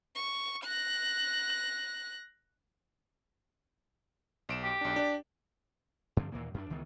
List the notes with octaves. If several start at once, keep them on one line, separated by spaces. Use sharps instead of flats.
C#6
F#6 A#6
B1 D7 E7
G4
B1 D4
D4 D5
G2 D3 F3 C4
D#2 A#2 E3 A#3
F#2 C#4 D4
C#2 D#3 E3 B3